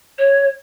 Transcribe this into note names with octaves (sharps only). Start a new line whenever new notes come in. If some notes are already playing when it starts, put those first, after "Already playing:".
C#5